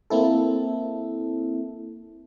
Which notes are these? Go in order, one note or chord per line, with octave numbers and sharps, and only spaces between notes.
A#3 C4 E4 A4